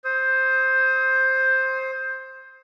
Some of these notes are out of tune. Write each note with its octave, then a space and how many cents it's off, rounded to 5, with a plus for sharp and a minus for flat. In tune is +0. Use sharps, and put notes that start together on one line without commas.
C5 +10 D#6 +35